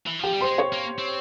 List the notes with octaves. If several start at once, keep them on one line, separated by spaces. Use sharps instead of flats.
E3
F3 G4 G5
G3
G#3 C5 C6
C#5 C#6
A#3
C4